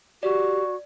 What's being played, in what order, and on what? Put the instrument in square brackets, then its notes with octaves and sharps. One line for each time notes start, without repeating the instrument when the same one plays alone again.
[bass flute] F#4 [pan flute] G4 [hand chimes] D5